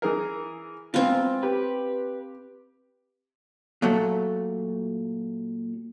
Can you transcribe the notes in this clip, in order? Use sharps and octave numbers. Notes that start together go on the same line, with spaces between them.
E3 G#4 A#4
E2 G#2 C4 F4 B4
G4 B4
A#2 F#3 A3